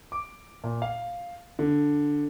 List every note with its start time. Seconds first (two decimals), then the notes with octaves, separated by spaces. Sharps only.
0.12 D6
0.64 A#2
0.82 F5
1.59 D3